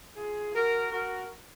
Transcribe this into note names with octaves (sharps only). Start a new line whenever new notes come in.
F4 G#4
F#4 A#4
F#4 A#4